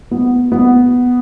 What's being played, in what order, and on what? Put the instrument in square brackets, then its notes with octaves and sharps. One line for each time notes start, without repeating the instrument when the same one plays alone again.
[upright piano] B3
B3